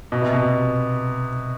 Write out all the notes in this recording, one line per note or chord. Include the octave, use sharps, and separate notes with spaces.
B2
C3
B2